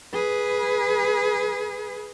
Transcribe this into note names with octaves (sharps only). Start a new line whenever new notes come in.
G#4 B4